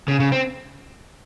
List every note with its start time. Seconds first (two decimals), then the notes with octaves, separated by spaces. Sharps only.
0.08 C#3
0.20 C#3
0.32 C4